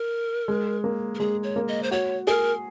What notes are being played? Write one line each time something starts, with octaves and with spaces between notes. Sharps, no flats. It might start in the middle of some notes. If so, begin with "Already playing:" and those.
Already playing: A#4
G#3
A#3
A#4
G#3 G#4
C#5
A#3
D#5
C5
F#4 C#5
G#4 A#4